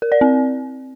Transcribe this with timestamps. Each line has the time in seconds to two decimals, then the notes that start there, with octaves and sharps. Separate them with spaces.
0.02 A#4
0.12 D5
0.21 C4